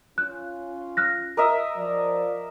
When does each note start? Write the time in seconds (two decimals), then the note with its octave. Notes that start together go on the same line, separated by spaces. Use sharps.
0.18 C#4 F4 F#6
0.97 F6 F#6 A#6
1.37 A#4 D#5 E5
1.77 F3 D5